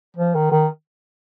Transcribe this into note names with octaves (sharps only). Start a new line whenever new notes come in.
F3
D#3
D#3